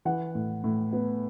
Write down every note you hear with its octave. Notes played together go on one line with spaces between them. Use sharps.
E3 F#5
A2
A2
B3